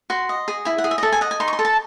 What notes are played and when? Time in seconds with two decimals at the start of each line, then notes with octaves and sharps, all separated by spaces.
0.10 F#4 C6
0.29 D#5
0.48 G#4
0.65 E4 G#5
0.78 F#5
0.84 G#4
0.91 E5
0.98 D#5
1.03 A4 E5
1.12 G#5
1.21 D#5 F#5
1.31 G#5
1.40 D#4 C6
1.48 C#6
1.53 C6
1.59 A4
1.65 A5